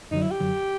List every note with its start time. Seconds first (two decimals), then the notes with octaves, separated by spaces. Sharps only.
0.11 F#2 D3 F#3 D#4
0.22 E4
0.31 G4
0.40 F#2 D3 F#3